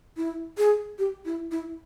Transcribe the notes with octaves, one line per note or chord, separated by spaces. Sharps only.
E4
G#4
G4
E4
E4